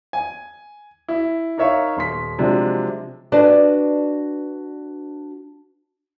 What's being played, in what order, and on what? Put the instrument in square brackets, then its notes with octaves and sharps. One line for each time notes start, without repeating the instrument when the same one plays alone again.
[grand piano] G#5
E4
D#4 A#4 C#5 E5 F5 C#6
D#1 C6 B6
C3 F3 F#3 G#3 D4
[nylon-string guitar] D4 F#4 B4 D5 D#5 A5